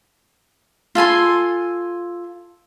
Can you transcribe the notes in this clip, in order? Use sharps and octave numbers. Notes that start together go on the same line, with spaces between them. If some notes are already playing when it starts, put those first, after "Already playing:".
F4 A4 G#5 C6